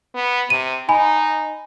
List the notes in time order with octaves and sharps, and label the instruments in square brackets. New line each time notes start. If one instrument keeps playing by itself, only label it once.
[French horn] B3
[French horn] C3 [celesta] D#7
[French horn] D#4 [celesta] G#5 B5